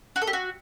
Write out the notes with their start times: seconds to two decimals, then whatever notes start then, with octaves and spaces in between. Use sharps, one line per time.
0.16 F#4
0.22 A4
0.27 G4
0.33 F#4